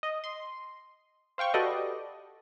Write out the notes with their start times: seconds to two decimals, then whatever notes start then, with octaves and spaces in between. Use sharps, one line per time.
0.03 D#5
0.24 C6
1.38 C5 F5 G5 C#6
1.54 F#4 G4 A4 B4 D5 D#5